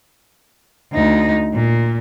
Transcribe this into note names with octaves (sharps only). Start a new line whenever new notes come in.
D2 D#4
A#2